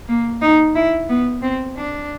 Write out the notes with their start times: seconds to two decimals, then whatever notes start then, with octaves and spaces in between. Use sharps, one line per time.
0.08 A#3
0.42 D#4
0.75 E4
1.09 B3
1.42 C4
1.76 D4